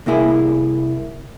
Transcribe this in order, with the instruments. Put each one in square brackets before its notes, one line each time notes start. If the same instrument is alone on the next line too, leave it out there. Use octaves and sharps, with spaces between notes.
[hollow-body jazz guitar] C2 A#3 E4 G#4